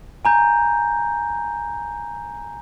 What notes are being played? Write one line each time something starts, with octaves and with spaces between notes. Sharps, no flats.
G#5 A#5 G6